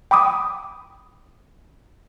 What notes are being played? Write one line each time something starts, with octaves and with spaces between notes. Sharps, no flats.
G5 B5 D6 D#6